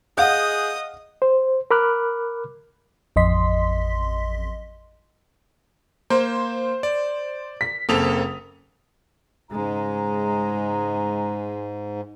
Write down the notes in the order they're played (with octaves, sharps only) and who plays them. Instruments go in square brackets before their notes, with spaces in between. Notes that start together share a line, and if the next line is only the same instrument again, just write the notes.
[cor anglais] G#4 [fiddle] D#5 D#6 [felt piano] F5 F#5 [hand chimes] F#6 G6
[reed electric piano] C5
A#4 B5 D6 F6 F#6
[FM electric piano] A1 F2 D#5 C6 B6
[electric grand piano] A#3 [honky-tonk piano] C5
[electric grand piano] D5
[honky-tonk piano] B6
[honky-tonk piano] F#1 D#6 F7 [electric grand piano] A#3 C4 A4
[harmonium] G#2 [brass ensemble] C#3 G#4 A#5 [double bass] G#3